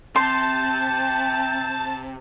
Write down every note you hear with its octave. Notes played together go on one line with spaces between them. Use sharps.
C3 A5 C6 G6